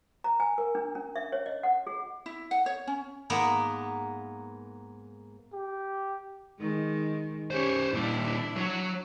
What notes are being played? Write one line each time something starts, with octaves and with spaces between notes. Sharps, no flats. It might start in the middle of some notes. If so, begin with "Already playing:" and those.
A#5
G#5
A#4
D4
C#4
E5
C#5
D#5
F#5
G#4
E4
F#5
C#5
C#4
G#2 A#3 B3
G4
D#3 G#3
C#4 G4 C5 C#5
A#2 G3 D4 E4
F#3 C#5